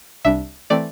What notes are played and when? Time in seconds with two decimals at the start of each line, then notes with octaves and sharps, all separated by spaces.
0.25 C2 C3 G3 D4 E5
0.70 E3 A3 C4 D5